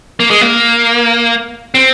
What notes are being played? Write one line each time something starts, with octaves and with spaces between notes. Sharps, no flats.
A#3
G#3
A#3
C4